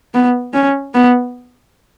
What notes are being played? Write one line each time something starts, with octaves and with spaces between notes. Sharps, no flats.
B3
C#4
B3